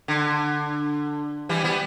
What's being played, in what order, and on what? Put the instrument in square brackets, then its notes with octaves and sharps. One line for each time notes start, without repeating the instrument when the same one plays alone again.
[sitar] D3
E3 G3
G3 B3